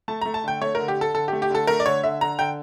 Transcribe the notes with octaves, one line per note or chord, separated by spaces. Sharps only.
A3 A5
A3 A#5
A5
D3 G5
A3 C#5
D3 A#4
G4
D3 A4
D3 A4
G4
A3
G4
D3 A4
A3 A#4
D5
D3 C#5
D3 E5
D3 A#5
D3 G5